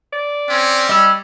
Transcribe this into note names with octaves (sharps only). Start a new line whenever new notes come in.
D5
C4 C#4
G3 D#5 E6